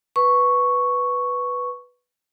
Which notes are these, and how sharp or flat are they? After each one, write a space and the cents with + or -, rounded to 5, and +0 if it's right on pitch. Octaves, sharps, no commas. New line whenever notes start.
B4 +0 C#6 +0